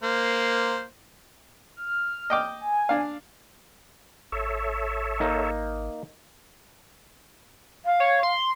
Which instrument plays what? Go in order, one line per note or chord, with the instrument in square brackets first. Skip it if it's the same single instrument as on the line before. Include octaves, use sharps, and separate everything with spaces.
[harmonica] A#3 C5
[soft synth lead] F6
[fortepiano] D#5 G5 D6
[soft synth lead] G#5
[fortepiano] D4 F5
[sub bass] G#1 [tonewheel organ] A4 C#5 E5
[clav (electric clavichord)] A#3 D#4
[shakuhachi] F5
[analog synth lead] C#5
C6